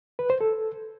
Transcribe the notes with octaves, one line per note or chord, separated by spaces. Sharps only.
B4
C5
A4